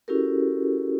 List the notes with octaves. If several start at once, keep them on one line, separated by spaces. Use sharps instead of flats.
C#4 E4 F#4 G4 A4 A#4